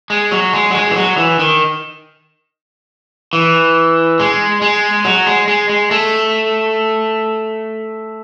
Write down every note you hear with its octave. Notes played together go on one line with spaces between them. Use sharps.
G#3
F#3
G#3
F#3
G#3
E3
F#3
E3
D#3
E3
G#3
G#3
F#3
G#3
G#3
G#3
A3